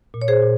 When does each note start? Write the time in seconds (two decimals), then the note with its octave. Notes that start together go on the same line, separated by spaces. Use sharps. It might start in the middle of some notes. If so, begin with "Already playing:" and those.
0.14 A#2
0.22 C#5
0.28 G#4 C5
0.42 A#2